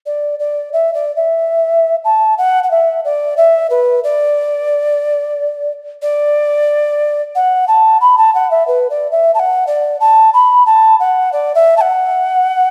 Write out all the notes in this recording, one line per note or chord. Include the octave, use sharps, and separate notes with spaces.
D5
D5
E5
D5
E5
A5
F#5
F#5
E5
D5
E5
B4
D5
D5
F#5
A5
B5
A5
F#5
E5
B4
D5
E5
A5
F#5
D5
A5
B5
A5
F#5
D5
E5
A5
F#5